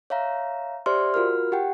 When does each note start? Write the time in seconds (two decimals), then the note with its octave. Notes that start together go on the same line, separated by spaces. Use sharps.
0.10 C#5 E5 F5 A#5
0.86 G4 C5 D5 E5 C6 F6
1.14 F4 F#4 A#4 F6
1.52 G4 F#5 G5